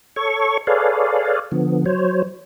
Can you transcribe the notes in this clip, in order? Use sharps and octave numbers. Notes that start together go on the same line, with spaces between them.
A4 C#5 C#6
G#4 A4 B4 C#5 D5 F5
D3 F3 B3
F#3 C5 C#5